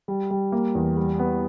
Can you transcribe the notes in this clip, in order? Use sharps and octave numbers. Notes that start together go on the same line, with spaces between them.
G3
G3
A#3
E2
G3
B3